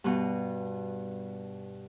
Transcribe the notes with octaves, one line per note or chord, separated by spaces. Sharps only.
G2 B2